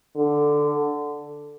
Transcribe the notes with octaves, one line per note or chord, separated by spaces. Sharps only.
D3